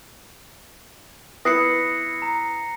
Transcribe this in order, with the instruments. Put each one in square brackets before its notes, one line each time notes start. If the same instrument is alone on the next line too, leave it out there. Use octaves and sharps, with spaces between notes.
[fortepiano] B3 E4 B4 [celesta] D#6 [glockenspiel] A#6 C7 C#7
[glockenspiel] A#5